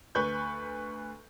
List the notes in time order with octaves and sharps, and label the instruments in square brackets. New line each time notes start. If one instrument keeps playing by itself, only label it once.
[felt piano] D2 B4 C#6 G6